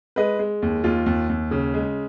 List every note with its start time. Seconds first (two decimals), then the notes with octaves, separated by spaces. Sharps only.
0.16 G#3 B4 D#5
0.39 G#3
0.62 D#2
0.84 D#2 F4
1.06 D#2
1.29 D#2
1.51 C#3
1.74 G#3